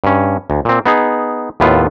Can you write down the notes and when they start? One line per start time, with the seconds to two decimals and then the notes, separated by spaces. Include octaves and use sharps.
0.04 G2 C#4
0.50 D2
0.65 A#2 C4
0.86 B3 D#4 G#4
1.60 D#2 A2 B3 E4 F4